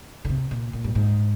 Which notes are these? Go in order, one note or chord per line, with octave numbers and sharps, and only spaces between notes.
D3
C3
A#2
A#2
G2
G#2